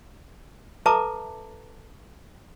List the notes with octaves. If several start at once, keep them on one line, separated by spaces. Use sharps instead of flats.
A4 B4 E5 A5 A#5 D6